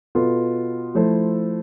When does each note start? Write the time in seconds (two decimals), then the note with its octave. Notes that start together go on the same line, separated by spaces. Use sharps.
0.15 B2 B3 F4 A4
0.95 F3 A3 E4 A4 C5